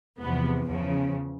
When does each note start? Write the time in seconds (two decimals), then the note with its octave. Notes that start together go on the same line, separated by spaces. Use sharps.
0.21 E2 C3 F3 B3
0.67 E2 C#3 F3